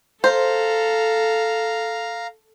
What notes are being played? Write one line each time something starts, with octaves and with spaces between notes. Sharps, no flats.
A4 C5 F5 A#5